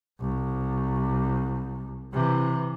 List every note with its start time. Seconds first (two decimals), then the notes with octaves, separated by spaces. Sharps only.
0.20 C2
2.13 C3 E3